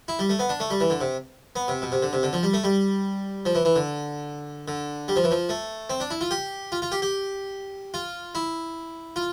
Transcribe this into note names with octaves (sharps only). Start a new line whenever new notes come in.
E4
G3
A3
B3
D4
A3
G3
E3
D3
C3
B3
C3
B2
C3
D3
C3
D3
F3
G3
A3
G3
F3
E3
E3
D3
D3
G3
F3
E3
F3
A3
C4
D4
E4
F4
G4
F4
F4
G4
G4
F4
E4
F4